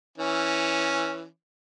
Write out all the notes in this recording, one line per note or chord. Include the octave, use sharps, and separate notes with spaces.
E3 C#4